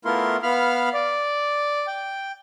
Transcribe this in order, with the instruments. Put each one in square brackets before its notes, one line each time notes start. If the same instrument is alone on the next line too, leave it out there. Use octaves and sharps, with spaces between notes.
[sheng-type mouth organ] A3 B3 E4 F4 A#4 C6
B3 F5 B5 F6
D5
G5